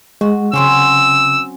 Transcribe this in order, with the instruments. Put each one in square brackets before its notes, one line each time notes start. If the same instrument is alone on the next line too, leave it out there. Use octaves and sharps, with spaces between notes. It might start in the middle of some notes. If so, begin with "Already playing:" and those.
[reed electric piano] G#3 [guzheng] F#4
[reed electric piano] C#3 [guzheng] F#3 C4 C#4 [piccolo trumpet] E6